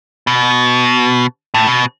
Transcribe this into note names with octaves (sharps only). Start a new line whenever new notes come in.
B2
A2
B2